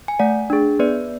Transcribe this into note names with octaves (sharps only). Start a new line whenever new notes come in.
G#5
A3 D5 F#5
D4 G#4
B3 B4 D5